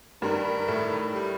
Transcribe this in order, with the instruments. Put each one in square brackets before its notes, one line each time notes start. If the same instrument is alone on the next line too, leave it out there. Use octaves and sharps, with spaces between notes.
[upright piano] G2 G3 [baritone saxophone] D#3
[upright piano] A2 A3
[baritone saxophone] G3